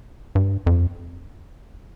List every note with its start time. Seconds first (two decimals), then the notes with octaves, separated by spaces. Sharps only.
0.35 G2
0.66 F2